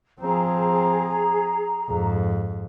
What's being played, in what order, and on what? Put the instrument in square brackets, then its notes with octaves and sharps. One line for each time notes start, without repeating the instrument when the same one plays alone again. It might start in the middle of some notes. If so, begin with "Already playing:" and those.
[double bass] F3 C4 [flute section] G#4 A#5
[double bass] F2 G#2